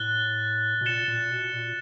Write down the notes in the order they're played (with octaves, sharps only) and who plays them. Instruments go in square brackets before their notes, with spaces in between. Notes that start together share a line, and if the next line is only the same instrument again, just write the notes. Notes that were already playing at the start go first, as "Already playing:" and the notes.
Already playing: [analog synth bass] A2 [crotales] F#6 A6 G7
[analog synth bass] B2
[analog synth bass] A#2 [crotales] A6 C#7 E7 G7
[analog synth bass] A#2
B2
A#2